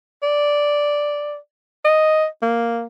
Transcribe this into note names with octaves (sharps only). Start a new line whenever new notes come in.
D5
D#5
A#3